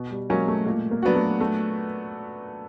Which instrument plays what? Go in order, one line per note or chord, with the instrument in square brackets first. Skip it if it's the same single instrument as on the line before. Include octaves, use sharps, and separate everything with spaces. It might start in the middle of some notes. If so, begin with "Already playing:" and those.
Already playing: [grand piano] B2
[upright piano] G3
[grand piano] F#3 A#3 C#4 [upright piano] G#3
[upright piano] A3
[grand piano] A#2 [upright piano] A3
[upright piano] A#3
[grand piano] F#3 B3 D4 F#4
[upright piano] A3
A3